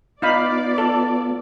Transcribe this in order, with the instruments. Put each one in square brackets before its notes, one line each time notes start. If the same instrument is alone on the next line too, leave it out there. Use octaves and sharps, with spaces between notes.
[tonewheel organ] B3 F4 [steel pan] D#4 F5 B5 [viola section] D5
[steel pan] A4